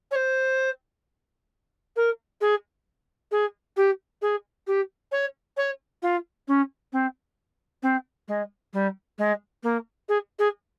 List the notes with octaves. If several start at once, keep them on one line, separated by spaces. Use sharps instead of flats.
C#5
C5
A#4
G#4
G#4
G4
G#4
G4
C#5
C#5
F4
C#4
C4
C4
G#3
G3
G#3
A#3
G#4
G#4